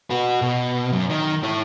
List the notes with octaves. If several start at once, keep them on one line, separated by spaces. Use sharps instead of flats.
F#4 B4
B2
F#2
D#3
E4 C#5